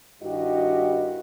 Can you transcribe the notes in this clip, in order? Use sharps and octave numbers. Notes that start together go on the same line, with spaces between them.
G2 D#3 E4 F#4 G4 D#5